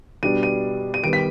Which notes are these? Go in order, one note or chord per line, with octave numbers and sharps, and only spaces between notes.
B2 G3 D4 D#7
D#7
D#7
D#3 G3 B3 D7
B6